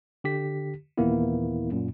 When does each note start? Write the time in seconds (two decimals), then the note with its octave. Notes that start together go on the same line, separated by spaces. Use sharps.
0.24 D3 G4 B6
0.97 D#2 A#2 E3 A#3 B3 E4
1.71 F#2 A#2